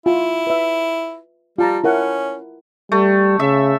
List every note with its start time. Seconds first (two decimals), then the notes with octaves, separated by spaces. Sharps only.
0.06 E4 F4
0.47 B4 E5
1.58 G3 F4 A5 A#5
1.84 C#4 E4 A#4 F#5
2.92 G3 A3
3.40 C#3 E5